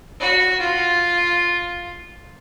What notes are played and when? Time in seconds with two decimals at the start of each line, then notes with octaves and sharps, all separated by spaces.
0.20 F#4
0.60 F4